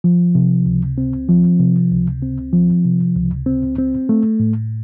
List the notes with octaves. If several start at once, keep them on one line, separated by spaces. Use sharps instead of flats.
F3
C3
C#2
C4
F3
C3
C#2
C4
F3
C3
C#2
C4
C4
A3
A2